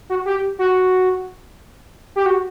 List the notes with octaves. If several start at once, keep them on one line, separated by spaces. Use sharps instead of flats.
F#4
G4
F#4
G4
F#4